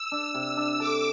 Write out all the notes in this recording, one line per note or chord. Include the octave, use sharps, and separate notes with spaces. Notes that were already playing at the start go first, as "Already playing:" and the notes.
Already playing: E6
D4
C3
D4
A4 D6